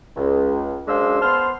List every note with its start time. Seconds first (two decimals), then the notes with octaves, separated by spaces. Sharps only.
0.16 C#2
0.88 F#2 G#3 D4 C5 F5 E6
1.21 B3 C5 A5 C6 F6